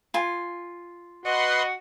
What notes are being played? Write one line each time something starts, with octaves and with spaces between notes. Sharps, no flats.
F4 G#5
F#4 B4 D#5 F#5 C6